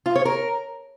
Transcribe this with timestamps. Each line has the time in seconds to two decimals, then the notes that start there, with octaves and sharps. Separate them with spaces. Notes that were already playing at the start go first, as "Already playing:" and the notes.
0.06 F4
0.16 C#5
0.25 A#4